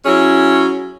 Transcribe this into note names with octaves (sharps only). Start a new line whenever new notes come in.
F#3 C#4 E4 G#4